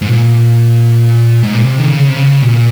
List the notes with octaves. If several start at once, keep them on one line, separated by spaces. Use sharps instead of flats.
G#2
A#2
G#2
A#2
C3
D#3
C#3
C3
C#3
A#2